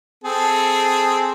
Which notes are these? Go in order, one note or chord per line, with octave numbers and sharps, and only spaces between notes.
C4 G#4 A4